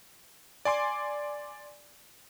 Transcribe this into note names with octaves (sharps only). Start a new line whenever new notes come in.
D5 G#5 C6 D6